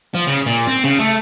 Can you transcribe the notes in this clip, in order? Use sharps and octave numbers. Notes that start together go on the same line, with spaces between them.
F3
C#3
A#2
C4
C#3
A3